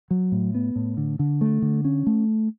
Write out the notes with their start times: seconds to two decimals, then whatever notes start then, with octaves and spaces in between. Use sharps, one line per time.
0.11 F#3
0.32 A2
0.55 B3
0.76 A2
0.97 D3
1.19 D3
1.41 A3
1.62 D3
1.85 C#4
2.07 A3